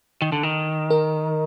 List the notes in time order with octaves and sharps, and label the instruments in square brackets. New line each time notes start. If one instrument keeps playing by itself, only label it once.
[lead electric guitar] D#3
D3
D#3
[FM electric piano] A#4